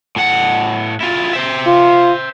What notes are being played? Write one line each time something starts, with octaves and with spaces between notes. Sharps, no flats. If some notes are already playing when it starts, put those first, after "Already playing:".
A2 F#5
E4 F4
C5 E5
F4